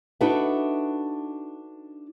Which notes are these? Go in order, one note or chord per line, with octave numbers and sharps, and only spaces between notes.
D4 D#4 F#4 A4 B4 E5